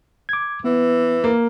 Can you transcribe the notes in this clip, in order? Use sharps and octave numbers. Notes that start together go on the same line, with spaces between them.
D6 G#6
E3 B3
A#3